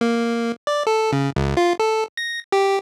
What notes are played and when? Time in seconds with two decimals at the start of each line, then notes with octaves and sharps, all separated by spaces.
0.01 A#3
0.67 D5
0.87 A4
1.12 C#3
1.36 C#2
1.57 F4
1.79 A4
2.17 A#6
2.52 G4